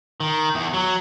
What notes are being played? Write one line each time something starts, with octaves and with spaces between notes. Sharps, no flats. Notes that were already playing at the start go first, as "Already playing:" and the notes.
D#3
E2
F#3